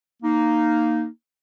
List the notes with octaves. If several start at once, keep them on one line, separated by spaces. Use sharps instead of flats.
A#3 D#4